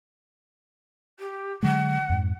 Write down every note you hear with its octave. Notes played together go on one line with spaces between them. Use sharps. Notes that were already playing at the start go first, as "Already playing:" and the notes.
G4
D3 F#3 G#3 F#5
F2 G#2